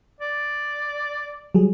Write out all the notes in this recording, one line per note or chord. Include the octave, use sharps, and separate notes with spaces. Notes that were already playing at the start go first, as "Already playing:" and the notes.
D5
F#3 G3 G#4